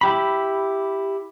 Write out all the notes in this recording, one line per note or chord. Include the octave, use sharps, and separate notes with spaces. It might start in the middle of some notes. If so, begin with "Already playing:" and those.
E4 G4 B5